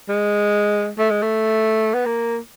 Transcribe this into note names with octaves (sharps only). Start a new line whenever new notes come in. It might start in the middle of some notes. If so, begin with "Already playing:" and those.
G#3
A3
G#3
A3
B3
A#3